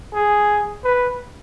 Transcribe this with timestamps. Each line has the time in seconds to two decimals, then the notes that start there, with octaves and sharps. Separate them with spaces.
0.14 G#4
0.84 B4